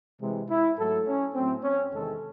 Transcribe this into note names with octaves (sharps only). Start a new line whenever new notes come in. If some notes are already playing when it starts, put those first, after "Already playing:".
C3 E3 G#3
E4
G#2 F#3 A3 A4
C#4
A2 F#3 A3 C4
C#4
E2 C3 D#3 G#3 A4